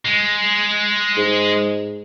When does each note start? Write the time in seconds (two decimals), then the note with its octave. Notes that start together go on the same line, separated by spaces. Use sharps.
0.05 G#3
1.17 G#2